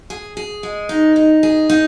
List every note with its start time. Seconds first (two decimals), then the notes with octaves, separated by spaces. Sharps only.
0.10 G#4
0.37 G#4
0.63 G#3
0.89 D#4
1.16 D#4
1.43 G#4
1.70 D#4